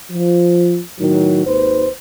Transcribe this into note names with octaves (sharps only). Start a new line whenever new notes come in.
F3
A2 D#3 F#3
G#1 D#2 B4 C5